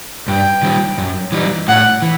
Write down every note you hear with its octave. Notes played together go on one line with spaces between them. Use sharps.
G2 G5
D#3 G3
F#2
E3 G3 D#4
A2 F#5
E3